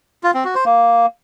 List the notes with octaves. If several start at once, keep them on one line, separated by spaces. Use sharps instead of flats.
F4
C4
F#4
C5
A#3